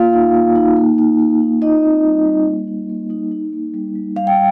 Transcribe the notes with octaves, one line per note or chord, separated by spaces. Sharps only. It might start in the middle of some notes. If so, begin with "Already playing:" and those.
Already playing: A#3 F4 F5
D#4
A#3
D#4
A#3
D#4
A#3
D#4
D#4 F4 D#5
C4
G3
G3
A#3
D#4
A#3
D#4
D#4
A#3
G3
G3
G3 F5
G5